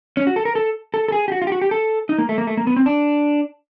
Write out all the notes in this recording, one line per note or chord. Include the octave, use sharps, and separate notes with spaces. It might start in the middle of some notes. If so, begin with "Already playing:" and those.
C#4
F#4
A4
A#4
A4
A4
A4
G#4
G4
F#4
F4
G4
F#4
G4
A4
D#4
A#3
A3
A#3
A3
A#3
B3
C4
D4